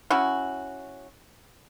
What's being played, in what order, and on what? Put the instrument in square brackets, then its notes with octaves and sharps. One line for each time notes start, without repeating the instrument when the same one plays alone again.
[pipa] C#4 E4 F#4